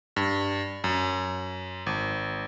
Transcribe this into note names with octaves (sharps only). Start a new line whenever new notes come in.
G2
F#2
G#1